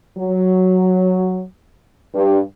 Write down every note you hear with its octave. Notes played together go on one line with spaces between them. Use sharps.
F#3
G2